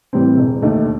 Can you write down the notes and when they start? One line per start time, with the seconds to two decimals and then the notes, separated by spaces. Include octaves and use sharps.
0.13 A2 E3 G3 C4
0.38 E1
0.62 D#2 D#3 A3